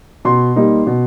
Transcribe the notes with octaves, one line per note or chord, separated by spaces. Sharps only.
B2 C6
G3 A#3 D#4
B2